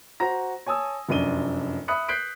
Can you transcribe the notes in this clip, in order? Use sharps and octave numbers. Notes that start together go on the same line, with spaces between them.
F#4 C5 A#5 A#6
C#5 G#5 A5 D#6 E6
F1 F#2 D4 D#7 G7
E5 B5 D#6 F#6 C#7
F#6 G6 B6 C7 D7